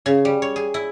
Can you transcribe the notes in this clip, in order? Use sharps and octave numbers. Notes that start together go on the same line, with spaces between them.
C#3
G3
C#5
G#4
E4